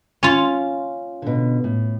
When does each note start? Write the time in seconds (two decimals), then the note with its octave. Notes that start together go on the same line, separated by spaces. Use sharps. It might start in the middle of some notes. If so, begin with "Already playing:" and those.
0.23 C#4 F4
1.22 B2 D3
1.64 A2